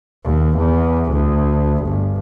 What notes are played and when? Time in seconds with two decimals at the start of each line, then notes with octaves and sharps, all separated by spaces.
0.25 D#2
0.57 E2
1.12 D2
1.85 G1